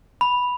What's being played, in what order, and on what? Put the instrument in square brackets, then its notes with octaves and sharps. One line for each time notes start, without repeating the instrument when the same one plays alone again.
[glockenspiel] B5